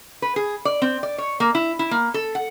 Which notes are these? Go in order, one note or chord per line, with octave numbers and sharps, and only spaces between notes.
B4
G#4
D5
C4
D5
C#5
A#3
E4
E4
A#3
A4
F#5